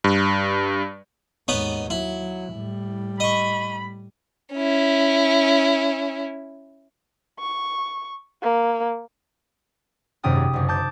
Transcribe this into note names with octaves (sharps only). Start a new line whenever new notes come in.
G2
D#2 G#2 B3 D#4 C#5
F#3 E4
A2 G3
D#5 B5 C#6
C#4 E4
C#6
A#3
G#1 F#2 C3 G5 D#6 F6
G4
F#1 F#2
A5 D6 G6